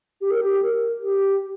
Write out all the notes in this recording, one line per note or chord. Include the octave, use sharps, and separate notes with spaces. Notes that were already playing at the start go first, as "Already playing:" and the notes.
G4
A#4
G4
A#4
G4